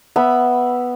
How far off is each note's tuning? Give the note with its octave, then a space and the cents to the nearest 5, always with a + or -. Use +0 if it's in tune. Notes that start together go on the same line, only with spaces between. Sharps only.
B3 +0 E5 +0 B5 -10